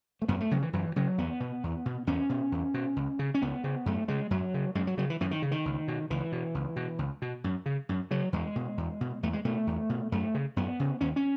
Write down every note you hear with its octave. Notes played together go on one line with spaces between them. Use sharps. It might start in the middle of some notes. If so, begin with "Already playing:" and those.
A3
F#2 B3
A3
C#3 F#3
E3
F#2 E3
C#3 F#3
E2 B3
B2
E2
B2
E2 C#4
B2
E2
B2
C#2
C#3
C#4
C#2 B3
C#3
F#2 A3
C#3 G#3
F#2 F#3
C#3
F#2 G#3
F#3
C#3 F#3
E3
F#2 E3
D#3
C#3
D#3
C#2
B2
C#2 E3
B2
C#2
B2
C#2
B2
F#2
C#3
F#2
C#3 F#3
E2 G#3
B2
E2
B2
E2 A3
G#3
B2 A3
E2
B2
F#2 A3
C#3
F#2 B3
C#3
D#2 C#4
C#4